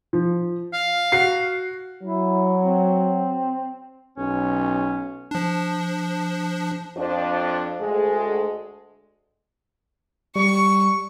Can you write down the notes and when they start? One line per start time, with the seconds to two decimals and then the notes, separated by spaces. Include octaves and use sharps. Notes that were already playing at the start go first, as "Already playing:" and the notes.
0.13 F3
0.73 F5
1.12 F#4 C7
2.03 F#3 E4
2.60 C4
4.17 B1 C#4
5.31 F3 D4
6.96 F2 F3 D4
7.81 D2 G#3 A4
10.36 G3 C#6